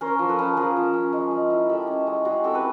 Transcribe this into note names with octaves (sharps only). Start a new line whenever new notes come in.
C#4 A#4 C5
F3
A4 B4
C#4
F3 G#4 A#4
F3
C#4
G#3
G#3
E4
G#3 G4 A4
C#4
G#3
G3 F#4 G#4
C4 G4 A4
B4